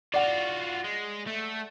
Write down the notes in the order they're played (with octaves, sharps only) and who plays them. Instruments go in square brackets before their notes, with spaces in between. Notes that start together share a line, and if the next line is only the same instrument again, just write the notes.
[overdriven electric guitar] F4 F#4 [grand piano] D5 F#5
[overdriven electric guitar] G#3
A3